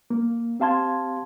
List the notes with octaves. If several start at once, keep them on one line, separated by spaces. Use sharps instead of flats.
A#3
C4 G4 F5 A5 C6 G#6